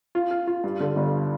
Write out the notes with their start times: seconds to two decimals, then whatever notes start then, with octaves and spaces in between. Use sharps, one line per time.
0.15 F4
0.31 F4
0.47 F4
0.64 G2
0.80 D3
0.96 G1